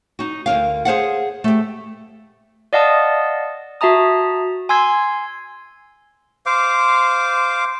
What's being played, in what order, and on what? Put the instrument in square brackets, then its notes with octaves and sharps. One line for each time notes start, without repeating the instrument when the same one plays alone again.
[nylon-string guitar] D#4 F#4
D2 B2 A#4 F5
G#4 C5 F5 F#5
A3 G4
[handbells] D5 D#5 F5 F#5 A5 D#6
F#4 E5 A5 A#5 D#6
G#5 C6 E6 G#6 C7
[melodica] C5 F5 D6